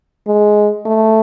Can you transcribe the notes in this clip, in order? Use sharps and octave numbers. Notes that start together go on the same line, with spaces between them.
G#3
A3